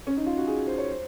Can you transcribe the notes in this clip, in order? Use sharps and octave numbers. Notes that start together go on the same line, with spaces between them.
C#4
D#4
F4
F#4
G#4
C5
C#5
C5